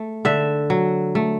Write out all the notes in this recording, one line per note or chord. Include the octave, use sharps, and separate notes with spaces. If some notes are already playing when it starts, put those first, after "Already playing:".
Already playing: A3
D3 E5
F#3
A3